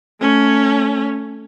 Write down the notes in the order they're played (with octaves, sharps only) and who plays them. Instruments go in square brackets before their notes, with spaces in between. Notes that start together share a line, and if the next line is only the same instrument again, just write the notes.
[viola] A3 C#4